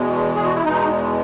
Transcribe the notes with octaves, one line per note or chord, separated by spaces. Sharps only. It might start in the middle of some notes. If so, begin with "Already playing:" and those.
Already playing: E2 B2 G#3
G#4
F#4
E4
E2 B2 G#3 D#4